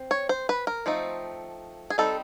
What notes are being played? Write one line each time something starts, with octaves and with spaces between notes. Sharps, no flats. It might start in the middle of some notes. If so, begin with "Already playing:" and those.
Already playing: C4
C#5
C5
B4
A#4
F3 A3 C4 D#4
G#4
G3 C4 D#4 A4